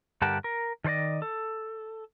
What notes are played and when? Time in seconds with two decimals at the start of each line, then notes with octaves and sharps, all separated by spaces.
0.22 G2 D3 G4 A#4 F#5 A5
0.44 A#4
0.84 D#3 A4 C5 D5 D#5
1.22 A4